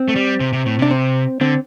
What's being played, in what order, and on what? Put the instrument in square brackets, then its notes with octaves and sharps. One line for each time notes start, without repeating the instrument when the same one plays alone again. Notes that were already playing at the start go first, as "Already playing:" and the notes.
Already playing: [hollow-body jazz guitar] C4
[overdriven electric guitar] A3
G3
C3
C3
A2
[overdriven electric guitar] C3 [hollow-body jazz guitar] D4
[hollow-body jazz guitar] C4
[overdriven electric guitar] D3 [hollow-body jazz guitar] C4